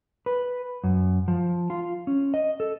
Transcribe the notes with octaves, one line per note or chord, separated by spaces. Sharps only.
B4
F#2
F3
F4
C#4
D#5
A4